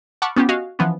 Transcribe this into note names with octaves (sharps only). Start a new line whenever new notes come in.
F#5 A5 B5 C#6 D6 F6
B3 C#4 F4 G4
F#4 D#5 F5 G#5
E3 F3 B3 C#4